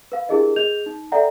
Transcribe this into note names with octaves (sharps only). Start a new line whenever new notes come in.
B4 F5
D4 E4 G4 G#4 A#4 D#5
G#4 D#5 G6 F7
D#4
A4 D5 E5 F#5 G5 A#5